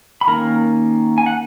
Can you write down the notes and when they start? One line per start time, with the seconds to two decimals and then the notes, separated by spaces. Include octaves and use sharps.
0.21 B5
0.27 D#3 A#3 C#4 A#4 A#5
1.18 G#5
1.26 F#5